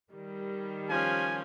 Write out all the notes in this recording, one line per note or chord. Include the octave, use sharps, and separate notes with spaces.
D#3 G3
F3 C#4 G#5